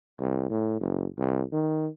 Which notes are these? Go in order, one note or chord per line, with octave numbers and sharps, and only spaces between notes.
C2
A2
F#1
C2
D#3